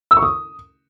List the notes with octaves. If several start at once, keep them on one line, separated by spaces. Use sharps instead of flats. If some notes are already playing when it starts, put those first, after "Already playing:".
E6
C#6
D#6